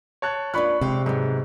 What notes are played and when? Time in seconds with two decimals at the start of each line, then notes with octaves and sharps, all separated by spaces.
0.22 C#5 A5 F#6
0.54 A#3 D4 F4 B5 C#6 F#6
0.81 C3 G#3 F5 G5
1.06 G#2 F#3 B3